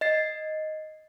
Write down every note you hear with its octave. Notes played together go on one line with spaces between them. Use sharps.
D#5 A6 C7